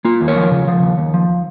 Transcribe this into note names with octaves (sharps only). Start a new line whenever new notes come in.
A#3 F4
D#2
A#4 C#5
F3
C#3
F3
D#2
D#2
F3